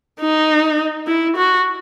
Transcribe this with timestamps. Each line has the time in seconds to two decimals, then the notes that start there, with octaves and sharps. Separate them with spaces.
0.20 D#4
1.07 E4
1.37 F#4